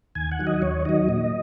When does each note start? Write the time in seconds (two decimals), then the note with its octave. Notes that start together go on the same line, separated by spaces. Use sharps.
0.15 D#2 G#5
0.31 F#5
0.39 D#3 F#3
0.47 D#5
0.62 D#2 C#5
0.85 D#3 F#3 D#5
1.09 A#2